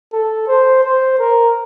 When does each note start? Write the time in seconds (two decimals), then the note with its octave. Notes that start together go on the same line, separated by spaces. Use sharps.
0.13 A4
0.47 C5
0.83 C5
1.19 A#4